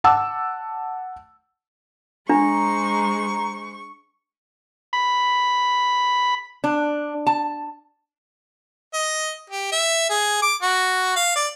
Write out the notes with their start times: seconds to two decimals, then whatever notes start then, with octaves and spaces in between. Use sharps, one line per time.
0.04 F#5 A5 D6 E6
2.29 G#3 D4 C5 A#5 C#6
4.93 B5
6.64 D4
7.27 A5
8.94 D#5
9.50 G4
9.72 E5
10.10 G#4
10.42 D6
10.62 F#4
11.16 F5
11.36 D5